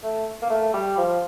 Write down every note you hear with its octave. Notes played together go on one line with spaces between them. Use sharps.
A3
A#3
A3
G3
F3